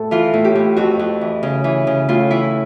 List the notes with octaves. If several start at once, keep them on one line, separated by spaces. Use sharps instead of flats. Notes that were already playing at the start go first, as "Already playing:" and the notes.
Already playing: A2 A4
E3 F4
A2
G4
A2
F2 F#4
F2
E3
C#3
E3
C#3
A2 F4
E3 E4